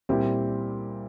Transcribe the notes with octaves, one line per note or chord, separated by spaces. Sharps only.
A#2 G3 C4 E4 G4